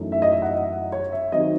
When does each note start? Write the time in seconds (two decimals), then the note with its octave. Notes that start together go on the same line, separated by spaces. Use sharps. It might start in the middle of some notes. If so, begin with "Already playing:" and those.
Already playing: F#2 E3 A3 D#4
0.12 E5
0.22 D#5
0.32 E5
0.42 F#5
0.52 E5
0.92 C#5
1.12 E5
1.32 D#3 F#3 C4 D#4 D#5